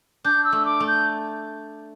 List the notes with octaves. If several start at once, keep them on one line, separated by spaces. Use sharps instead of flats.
D4 G6
E6
A3
D6
A3
G6